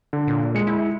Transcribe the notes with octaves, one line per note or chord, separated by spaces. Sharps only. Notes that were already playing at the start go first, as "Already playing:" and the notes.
D3
A#2
G#3 C#7
E4